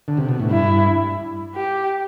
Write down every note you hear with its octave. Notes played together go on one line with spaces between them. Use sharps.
D3
C3
B2
A2
G2 E4
G4